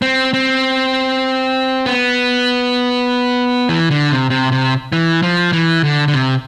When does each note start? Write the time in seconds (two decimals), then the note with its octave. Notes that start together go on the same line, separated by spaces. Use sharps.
0.02 C4
0.34 C4
1.86 B3
3.69 E3
3.91 D3
4.11 C3
4.30 C3
4.52 C3
4.92 E3
5.23 F3
5.53 E3
5.84 D3
6.08 D3
6.14 C3